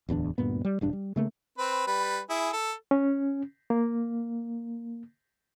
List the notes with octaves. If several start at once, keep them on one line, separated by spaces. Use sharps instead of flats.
D1 E2 C4 D4
D2 G2 A#2 B3
G3
E1 G2 D4
G3
C#3 A3 A#3
C4 B4
G3 B4
E4 G#4
A4
C#4
A#3